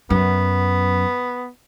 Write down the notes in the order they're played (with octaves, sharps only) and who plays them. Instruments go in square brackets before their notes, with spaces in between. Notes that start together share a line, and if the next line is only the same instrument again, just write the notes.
[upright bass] F#2 [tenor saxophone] B3